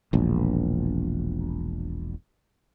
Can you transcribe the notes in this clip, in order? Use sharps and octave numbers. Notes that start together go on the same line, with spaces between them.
E1 A#1